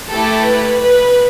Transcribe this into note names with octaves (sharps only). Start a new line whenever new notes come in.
A3 E4 G4 A4
B4
B4